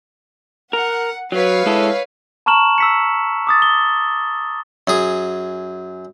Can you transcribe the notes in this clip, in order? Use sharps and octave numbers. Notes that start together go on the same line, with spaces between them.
A#4 F#5
F#3 B4 C#5 F5
G#3 E4 A4
A5 A#5 C#6 F6 E7 F#7
E6 B6 C#7
D6 D#6 A6
G7
F#2 G#4